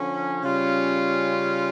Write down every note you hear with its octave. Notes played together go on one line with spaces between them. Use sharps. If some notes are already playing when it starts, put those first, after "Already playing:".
Already playing: D3 F3 C#4
C#3 G3 C#4 F4